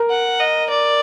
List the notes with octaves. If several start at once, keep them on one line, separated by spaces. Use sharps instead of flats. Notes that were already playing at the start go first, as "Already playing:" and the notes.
Already playing: A#4
F#5
D#5
D5